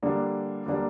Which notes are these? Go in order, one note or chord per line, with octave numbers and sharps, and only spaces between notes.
D3 G3 A#3 D4
D3 G3 A#3 D4